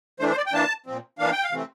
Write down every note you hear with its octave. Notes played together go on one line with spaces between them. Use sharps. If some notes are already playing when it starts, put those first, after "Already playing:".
E3 A3 D4 C5
C5
D5
G5
E3 A#3 D4 A5
A#2 F3 C4
E3 A#3 D4 F5
G5
F5
C3 E3 A3 C4